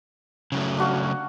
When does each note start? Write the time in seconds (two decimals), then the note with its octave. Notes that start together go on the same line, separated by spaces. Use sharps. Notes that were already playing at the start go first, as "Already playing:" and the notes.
0.52 C#3 F#3 A3
0.77 D4 F#4 F5